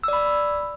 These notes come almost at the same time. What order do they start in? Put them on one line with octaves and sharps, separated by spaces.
E6 D5 B5